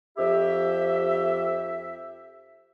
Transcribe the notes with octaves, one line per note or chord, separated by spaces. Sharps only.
F2 G4 E5